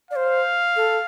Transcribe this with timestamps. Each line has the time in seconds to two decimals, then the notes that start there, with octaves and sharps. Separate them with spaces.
0.11 D5 F5
0.16 C5
0.76 A4